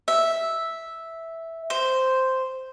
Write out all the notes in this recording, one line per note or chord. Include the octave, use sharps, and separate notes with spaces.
E5
C5